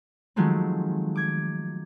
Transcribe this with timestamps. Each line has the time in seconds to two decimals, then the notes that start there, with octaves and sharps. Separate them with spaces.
0.36 D#3 F3 F#3 G#3 A3 C4
1.16 D6 G#6